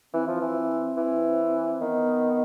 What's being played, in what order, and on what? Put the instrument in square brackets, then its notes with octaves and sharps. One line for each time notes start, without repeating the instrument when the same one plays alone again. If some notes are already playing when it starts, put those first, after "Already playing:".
[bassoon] E3 [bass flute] C4
[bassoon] F3
E3
E3
[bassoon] D#3 [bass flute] B3